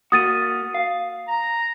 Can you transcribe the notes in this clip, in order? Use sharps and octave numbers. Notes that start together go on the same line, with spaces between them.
A#3 F#4 D#6 A6 D#7
F5
A#5